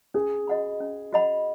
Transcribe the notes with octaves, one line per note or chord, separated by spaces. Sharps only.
C#4 G#4
F#4 D#5 F#5 B5
C#4
F#4 D#5 F#5 B5